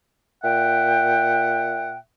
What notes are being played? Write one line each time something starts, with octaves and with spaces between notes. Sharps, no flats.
A#2 E5 F#5 G5